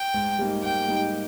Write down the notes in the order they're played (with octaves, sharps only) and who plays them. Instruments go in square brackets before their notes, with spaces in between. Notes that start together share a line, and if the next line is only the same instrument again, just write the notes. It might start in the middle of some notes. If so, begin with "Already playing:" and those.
Already playing: [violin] G5
[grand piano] G#2
G3 A#3 D#4
[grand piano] G#2 [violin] G5
[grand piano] G3 A#3 D#4